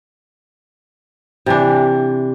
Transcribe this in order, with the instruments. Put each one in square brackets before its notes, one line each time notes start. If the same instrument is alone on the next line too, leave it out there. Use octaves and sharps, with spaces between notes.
[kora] C3 E3 D4